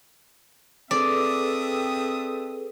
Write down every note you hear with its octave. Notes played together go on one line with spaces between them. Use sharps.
C4 D4 G#4 A4 B4 D5 E5 D#6